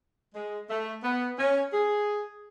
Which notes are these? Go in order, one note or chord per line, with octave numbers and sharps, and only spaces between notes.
G#3
A3
B3
C#4
G#4